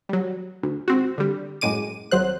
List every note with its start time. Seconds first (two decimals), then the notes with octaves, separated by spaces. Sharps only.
0.09 F#3 G3
0.63 D2
0.88 G#1 C4 F#4
1.18 D3 G3
1.61 F#2 A2 G#3 D6 D#7
2.11 G#1 F#3 C5 F#6